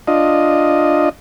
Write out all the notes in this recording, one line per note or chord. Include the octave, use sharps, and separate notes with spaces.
D4 F4 D#5